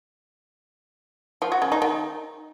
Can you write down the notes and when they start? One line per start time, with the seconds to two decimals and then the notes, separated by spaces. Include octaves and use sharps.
1.42 F3
1.52 F#4
1.62 C#3
1.72 D#4
1.82 D#3